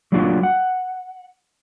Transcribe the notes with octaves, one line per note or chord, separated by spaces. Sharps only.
F#3 G3 A#3 D4 F4 F#4
F#5